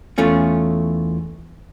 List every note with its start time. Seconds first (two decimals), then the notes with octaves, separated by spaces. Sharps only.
0.18 E2 A3 C#4 F4